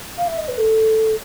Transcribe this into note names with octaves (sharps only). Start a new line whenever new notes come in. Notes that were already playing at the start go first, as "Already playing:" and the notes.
F5
E5
D#5
B4
A4